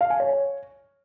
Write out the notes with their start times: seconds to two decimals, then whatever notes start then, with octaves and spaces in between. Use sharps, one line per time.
0.01 F5
0.10 G#5
0.20 C#5